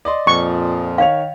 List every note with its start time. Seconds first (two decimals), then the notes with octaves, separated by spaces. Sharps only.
0.05 D5 D#5 C6
0.27 F2 A#2 F3 C#6
0.98 D#3 C#5 F5 F7